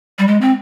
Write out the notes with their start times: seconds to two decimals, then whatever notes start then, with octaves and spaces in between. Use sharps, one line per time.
0.19 G3
0.28 G#3
0.41 C4